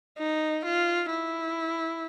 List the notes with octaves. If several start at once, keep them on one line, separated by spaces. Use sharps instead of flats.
D#4
F4
E4